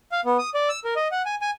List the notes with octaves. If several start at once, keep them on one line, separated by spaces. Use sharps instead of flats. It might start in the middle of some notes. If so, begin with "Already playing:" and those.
F5
B3
D#6
D5
E6
A#4
D#5
F#5
G#5
G#5